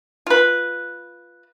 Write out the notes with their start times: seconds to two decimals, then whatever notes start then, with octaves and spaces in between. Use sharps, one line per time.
0.27 F4 B4